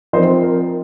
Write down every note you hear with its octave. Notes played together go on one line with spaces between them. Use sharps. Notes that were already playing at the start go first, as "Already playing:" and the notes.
F3 C4 D#4 C5 D#5
A#4